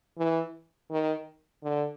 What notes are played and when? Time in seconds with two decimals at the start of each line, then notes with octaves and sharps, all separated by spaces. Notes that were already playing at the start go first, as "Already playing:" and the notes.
0.18 E3
0.91 D#3
1.63 D3